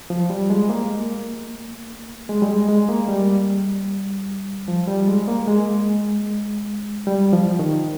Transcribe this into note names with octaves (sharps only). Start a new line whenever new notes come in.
F3
G3
G#3
A#3
G#3
G3
G#3
G#3
A#3
G3
F3
G3
G#3
A#3
G#3
G3
F3
D#3